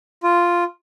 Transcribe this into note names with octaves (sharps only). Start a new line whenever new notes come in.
F4